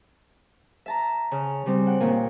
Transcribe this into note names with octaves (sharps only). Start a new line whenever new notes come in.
E5 A5 A#5
C#3 F6
C#3 G3 C4
F#5 G5
A#2 D#3 A#3 C#4